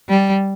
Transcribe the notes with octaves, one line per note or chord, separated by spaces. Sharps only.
G3